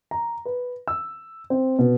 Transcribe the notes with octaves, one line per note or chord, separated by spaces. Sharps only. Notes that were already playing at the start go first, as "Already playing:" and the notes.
A#5
B4
E6
C4
B2